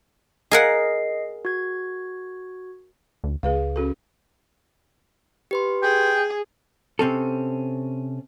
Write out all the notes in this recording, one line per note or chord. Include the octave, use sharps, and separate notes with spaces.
G#4 A#4 D#5 F#5 C7
F#4 G#6
D2
C#2 G#4 B4 F5
C#4 F#4 A4
G4 B4 C6
G#4 G5
C3 C4 C#4 A4